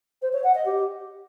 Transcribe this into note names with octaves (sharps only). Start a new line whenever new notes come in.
C5
C#5
F#5
D#5
G4